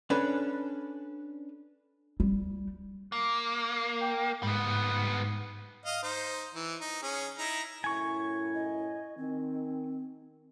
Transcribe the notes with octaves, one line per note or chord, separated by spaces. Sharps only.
C#4 D4 A4 B4
G3
A#3
G5
G#2 G3 B3
D#5 F5
D#4 C5
E3
D#4
C#4 G#4
D#4 E4 A#5
F#2 A2 E4 G#5 C#6
D#5
D#3 C4